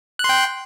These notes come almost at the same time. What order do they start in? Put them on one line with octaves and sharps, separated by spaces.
F#6 C6 G5